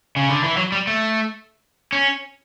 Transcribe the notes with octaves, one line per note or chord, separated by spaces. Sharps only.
C#3
D3
E3
F#3
G3
A3
C#4